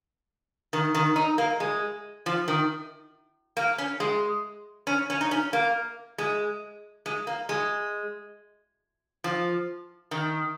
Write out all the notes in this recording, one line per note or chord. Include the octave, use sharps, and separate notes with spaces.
D#3
D#3
D#4
A#3
G#3
F3
D#3
A#3
C#4
G#3
C#4
C#4
D#4
C#4
A#3
G#3
G#3
A#3
G#3
F3
D#3